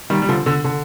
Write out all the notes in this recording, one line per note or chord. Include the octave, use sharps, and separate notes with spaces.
D#3 G3
G3
D3 F3
D3
D3